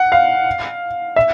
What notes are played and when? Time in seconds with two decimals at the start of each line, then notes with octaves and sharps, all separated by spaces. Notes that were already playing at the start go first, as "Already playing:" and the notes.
Already playing: F#5
0.12 F5
1.16 E5